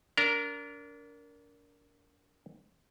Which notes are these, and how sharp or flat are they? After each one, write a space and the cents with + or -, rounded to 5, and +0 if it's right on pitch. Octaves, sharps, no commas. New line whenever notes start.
D4 -30 A#4 +0 A#5 +0